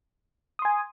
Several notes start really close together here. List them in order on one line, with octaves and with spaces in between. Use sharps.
D#6 C6 G#5